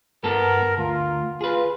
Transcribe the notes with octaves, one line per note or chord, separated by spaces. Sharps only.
G2 B3 A4 A#4
D2 F4
F4 G#4 B4